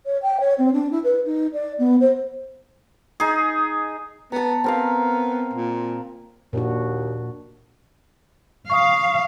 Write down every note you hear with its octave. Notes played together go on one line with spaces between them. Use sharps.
C#5
G5
C#5
C4
D4
E4
B4
D#4
D5
B3
C5
D#4 G#4
B3 A5 A#5
B3 C4 A#4 F5
A#2
D#2 A#2 D4 F#4
F5 C#6 D#6